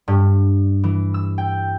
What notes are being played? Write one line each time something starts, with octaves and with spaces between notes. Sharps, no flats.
G2
E3
E6
G5